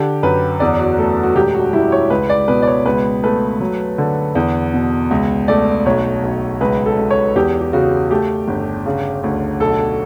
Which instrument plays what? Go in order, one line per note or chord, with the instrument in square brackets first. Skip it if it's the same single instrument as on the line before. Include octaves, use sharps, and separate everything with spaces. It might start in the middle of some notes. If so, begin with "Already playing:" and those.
Already playing: [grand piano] D3 G4
F#2 B4
E2 D5
F#4
A3 A4
F#4
E1 G4
F#4
G3 E4
C#5
C#2 B4
D5
B2 B4
D5
C#5
C#2 B4
A3 B4
F#3
D3
E2
B2
C#2
A3 D5
B1 C#5
B1
C#2 B4
A4
C#2
C#5
E2 G4
G4
C#3 F#4
A3 G4
G1
C#3
D2
B1 A4